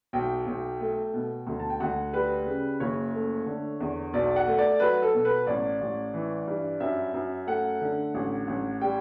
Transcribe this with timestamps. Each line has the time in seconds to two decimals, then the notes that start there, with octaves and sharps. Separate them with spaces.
0.13 B1 G5
0.46 B1
0.80 A3
1.14 B2
1.47 D2
1.60 A5
1.70 G5
1.80 D2 F#5
2.13 G3 B4
2.46 C#3
2.80 F#1 C#5
3.14 A3
3.46 D3
3.80 E2
4.13 B1 D5
4.36 F#5
4.47 A3
4.58 D5
4.80 F#3 B4
5.02 A4
5.14 B2
5.25 B4
5.46 A1 D5
5.81 A1
6.14 E3
6.47 G2
6.80 F#2 E5
7.14 F#2
7.47 A3 F#5
7.81 D3
8.14 A1
8.47 A1
8.81 G3 G5